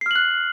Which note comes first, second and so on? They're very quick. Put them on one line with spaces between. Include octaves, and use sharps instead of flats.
C7 F6 F#7 F#6